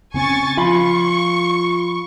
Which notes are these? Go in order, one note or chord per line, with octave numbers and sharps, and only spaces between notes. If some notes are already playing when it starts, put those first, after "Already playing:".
C#3 C4 C#4 G#5 C#6 A6
F3 F4 F5 B5 C#6